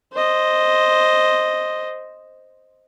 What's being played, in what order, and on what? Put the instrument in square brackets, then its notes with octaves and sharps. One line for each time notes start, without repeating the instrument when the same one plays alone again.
[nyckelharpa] C5 D#5